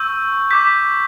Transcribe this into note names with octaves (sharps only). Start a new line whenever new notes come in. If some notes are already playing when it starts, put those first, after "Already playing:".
Already playing: C#6 E6 G6
D6 G6 B6